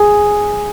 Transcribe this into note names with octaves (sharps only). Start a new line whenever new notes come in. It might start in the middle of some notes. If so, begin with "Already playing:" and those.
Already playing: G#4